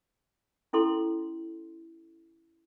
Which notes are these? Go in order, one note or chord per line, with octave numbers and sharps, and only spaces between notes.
C#4 E4 A4 C6